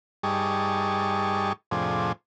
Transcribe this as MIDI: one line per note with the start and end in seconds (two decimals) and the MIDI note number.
0.23 1.53 43
0.23 1.53 55
0.23 1.53 63
0.23 1.53 68
0.23 1.53 81
0.23 1.53 85
1.71 2.12 41
1.71 2.12 45
1.71 2.12 48
1.71 2.12 53
1.71 2.12 62
1.71 2.12 68